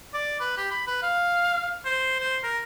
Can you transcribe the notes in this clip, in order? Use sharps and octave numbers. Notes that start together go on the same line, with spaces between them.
D5
B4
G4
B5
B4
F5
C5
C5
A#4